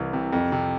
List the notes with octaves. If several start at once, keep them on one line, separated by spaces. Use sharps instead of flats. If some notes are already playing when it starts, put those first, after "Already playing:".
Already playing: C2 E3
C3
F2
C3